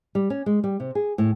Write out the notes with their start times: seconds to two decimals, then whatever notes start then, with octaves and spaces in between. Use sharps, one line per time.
0.15 G3
0.30 C#4
0.46 G#3
0.64 G3
0.80 C3
0.95 G#4
1.18 A2